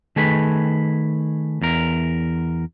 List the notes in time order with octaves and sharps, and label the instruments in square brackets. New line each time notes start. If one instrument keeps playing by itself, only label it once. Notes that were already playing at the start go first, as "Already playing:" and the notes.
[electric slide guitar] D#3 A3 G#4 B4
E2 A#4